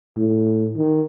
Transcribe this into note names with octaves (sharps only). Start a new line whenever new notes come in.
A2
D#3